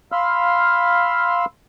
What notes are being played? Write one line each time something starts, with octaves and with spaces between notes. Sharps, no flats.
F5 B5 C6 E6 F6